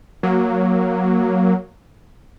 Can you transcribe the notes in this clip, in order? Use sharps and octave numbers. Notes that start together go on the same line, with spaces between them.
F#3 A#3